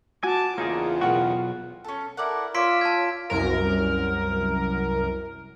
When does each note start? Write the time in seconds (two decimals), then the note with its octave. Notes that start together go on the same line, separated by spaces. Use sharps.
0.23 F#4 G#5 A5 D6
0.58 E2 C#3 A#3 D#4 F4 G#4 C#5
1.01 B1 B2 F#4 A#4 F#5 G5
1.84 C#4 A4
2.17 E4 A4 A#4 D5 F#5
2.54 F4 C#5 D5 C6 E6 B6 D7
2.81 A5 G#6
3.30 C2 F#2 A#4